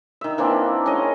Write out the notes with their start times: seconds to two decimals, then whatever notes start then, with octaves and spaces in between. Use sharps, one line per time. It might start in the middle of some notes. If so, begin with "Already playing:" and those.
0.21 D#3 E5
0.38 E3 A#3 C4 D4
0.86 C#4 G#4 A#4 D#5